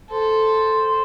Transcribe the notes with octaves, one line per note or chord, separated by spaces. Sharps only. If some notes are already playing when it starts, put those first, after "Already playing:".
A4 C5